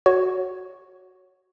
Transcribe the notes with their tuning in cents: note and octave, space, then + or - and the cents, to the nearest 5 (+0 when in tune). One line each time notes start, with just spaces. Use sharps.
F#4 +0 C#5 +0